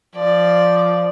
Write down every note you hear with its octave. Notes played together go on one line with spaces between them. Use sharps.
F3 D5